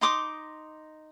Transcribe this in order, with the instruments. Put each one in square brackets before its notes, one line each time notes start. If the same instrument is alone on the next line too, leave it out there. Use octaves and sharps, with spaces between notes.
[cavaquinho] D#4 C6 D6 D#6